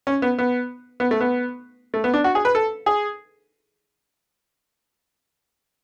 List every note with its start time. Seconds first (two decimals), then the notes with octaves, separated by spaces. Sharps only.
0.07 C#4
0.22 B3
0.39 B3
1.00 B3
1.11 A3
1.21 B3
1.94 A3
2.04 B3
2.14 D4
2.24 F#4
2.35 G#4
2.45 B4
2.55 A4
2.86 G#4